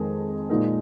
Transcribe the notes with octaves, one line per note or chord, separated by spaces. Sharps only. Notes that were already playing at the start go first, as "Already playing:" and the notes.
Already playing: F2 D#3 G#3 D#4 G#4
A#2 F3 G#3 D#4 A#4